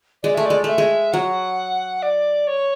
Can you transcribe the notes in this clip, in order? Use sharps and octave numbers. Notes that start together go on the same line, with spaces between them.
G#3 D5
A3 E5
G#3 D5
A3 D5 E5
G#3
F#3 F#5
D5
C#5